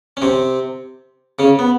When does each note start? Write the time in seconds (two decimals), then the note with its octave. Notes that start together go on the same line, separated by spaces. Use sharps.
0.17 C#4
0.22 C3 C4
1.39 C#3 C#4
1.59 B3